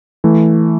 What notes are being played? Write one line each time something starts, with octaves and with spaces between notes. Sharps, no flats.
E3 A3